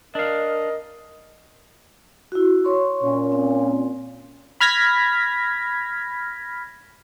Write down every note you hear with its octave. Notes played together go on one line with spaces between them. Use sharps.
D4 A#4 D#5 F5
E4 F#4
C#5 C6 C#6
A#2 C#4
C4
B5 F6 G#6 A#6 B6